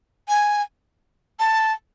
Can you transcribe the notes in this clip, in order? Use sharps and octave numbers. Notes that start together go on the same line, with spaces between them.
G#5
A5